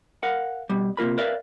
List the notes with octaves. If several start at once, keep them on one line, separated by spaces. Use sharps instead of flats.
A#4 F5 F#5
B2 G3
C3 A#3 F4 A#4 B5
A#4 B4 D5 E5 F5